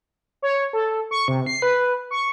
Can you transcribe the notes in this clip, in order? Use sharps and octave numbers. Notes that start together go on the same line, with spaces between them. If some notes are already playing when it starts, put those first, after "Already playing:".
C#5
A4
C#6
C3
C7
B4
C#6